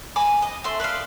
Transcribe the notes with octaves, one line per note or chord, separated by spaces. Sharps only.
G#5 B5 D6
D#5
A3 E5 C6
B4 D5 D#5 F5